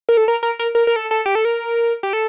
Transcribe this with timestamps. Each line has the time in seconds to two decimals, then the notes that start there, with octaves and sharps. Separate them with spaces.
0.09 A#4
0.17 A4
0.28 A#4
0.43 A#4
0.59 A#4
0.75 A#4
0.87 A#4
0.96 A4
1.11 A4
1.26 G4
1.35 A4
1.45 A#4
2.03 G4
2.13 A4